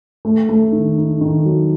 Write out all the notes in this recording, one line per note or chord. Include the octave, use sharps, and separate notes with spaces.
A3
A3
D#3
D#4
D#3
F#3